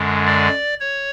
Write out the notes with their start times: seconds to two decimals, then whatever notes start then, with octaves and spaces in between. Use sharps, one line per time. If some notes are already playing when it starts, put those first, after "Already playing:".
Already playing: F#2 D3 G#3
0.27 D5
0.80 C#5